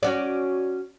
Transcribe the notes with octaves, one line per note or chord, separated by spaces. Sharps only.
C#4 F#4 D5